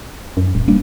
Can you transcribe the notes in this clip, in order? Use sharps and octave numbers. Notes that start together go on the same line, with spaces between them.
F#2
D#1
G3 A#3 D4